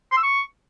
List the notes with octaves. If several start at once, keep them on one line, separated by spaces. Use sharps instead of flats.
C6
E6
C#6